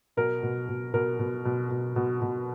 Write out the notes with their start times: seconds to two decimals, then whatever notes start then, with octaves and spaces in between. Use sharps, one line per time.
0.17 B2 A#4
0.43 B2
0.69 B2
0.94 B2 A#4
1.19 B2
1.45 B2
1.70 B2
1.96 B2
2.22 B2